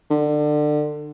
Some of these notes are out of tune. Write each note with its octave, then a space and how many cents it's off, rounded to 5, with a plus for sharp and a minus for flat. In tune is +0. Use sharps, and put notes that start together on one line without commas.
D3 +25